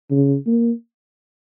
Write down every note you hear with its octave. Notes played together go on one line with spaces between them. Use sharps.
C#3
A#3